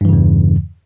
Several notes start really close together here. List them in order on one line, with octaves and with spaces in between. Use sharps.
G2 E3 C#3 E2